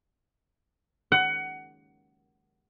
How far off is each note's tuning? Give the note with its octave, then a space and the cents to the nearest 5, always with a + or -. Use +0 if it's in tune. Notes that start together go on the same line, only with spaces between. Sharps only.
F#5 +20